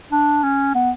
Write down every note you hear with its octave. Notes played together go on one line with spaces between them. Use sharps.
D4
C#4
B3